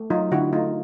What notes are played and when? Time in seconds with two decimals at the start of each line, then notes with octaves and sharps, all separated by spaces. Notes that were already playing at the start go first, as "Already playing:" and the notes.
Already playing: A3
0.10 F#3 D#4 F4
0.31 D3 E4 F#4
0.53 A3 D#4 F4